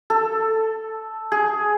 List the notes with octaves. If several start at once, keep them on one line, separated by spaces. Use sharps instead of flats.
A4
G#4